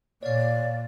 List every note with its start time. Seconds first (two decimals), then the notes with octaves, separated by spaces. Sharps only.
0.23 A#2 C#5 D5 F5